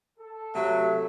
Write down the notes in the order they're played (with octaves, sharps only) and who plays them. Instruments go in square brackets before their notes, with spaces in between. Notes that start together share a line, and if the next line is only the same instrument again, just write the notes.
[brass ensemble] A4
[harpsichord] C3 B4 C#5 [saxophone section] F#3 A3 [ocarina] E5